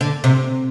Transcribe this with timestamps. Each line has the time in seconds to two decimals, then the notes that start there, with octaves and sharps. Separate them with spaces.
0.01 D3
0.24 C3